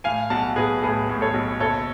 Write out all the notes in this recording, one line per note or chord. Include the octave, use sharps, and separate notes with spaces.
A2 F5 G#5
B1 F#5 A5
B1 G#4 B4
A2 G#4 B4
A2
A4 C#5
B1
F#1 A4 C#5